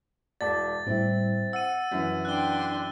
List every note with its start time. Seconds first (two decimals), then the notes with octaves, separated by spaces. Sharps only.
0.41 E1 D5 A5 D6 A6
0.86 A2 G3 C4 E4
1.53 F#5 E6 D#7
1.91 F#2 E3
2.25 D4 G5 C6 F#6 G7